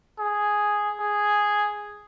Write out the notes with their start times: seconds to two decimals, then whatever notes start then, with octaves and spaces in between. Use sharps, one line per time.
0.19 G#4
1.00 G#4